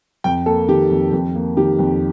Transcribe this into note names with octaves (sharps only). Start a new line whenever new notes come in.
F2 G5
A#3 A4
D#3 G4
F2
F2
A#3
D#3 G4
F2